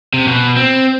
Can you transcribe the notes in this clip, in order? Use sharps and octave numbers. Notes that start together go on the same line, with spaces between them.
C3
B2
C4